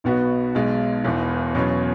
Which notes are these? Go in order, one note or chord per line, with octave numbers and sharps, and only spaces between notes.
B1 B2 B3 F#4 B4
B1 B2 G#3
E1 E2 E3 B3
E2 B2 F#3 C#4